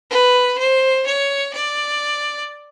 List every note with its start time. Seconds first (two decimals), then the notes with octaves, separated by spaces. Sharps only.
0.10 B4
0.59 C5
1.06 C#5
1.53 D5